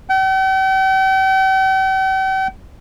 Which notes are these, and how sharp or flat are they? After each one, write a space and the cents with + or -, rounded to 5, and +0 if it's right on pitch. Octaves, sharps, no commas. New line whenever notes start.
G5 -45